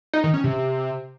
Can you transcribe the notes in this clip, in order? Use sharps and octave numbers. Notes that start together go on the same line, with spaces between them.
D#4
D#3
C#4
C3